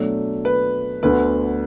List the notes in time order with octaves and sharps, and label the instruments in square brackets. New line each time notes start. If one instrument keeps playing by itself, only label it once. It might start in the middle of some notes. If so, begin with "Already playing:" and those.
Already playing: [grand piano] B2 F#3 A3 D4
B4
D2 D3 B3 B4